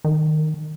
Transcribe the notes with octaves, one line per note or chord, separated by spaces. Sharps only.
D#3